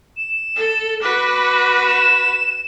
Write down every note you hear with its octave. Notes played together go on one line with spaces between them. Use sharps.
E7
A4
F#4 B4 D6
E7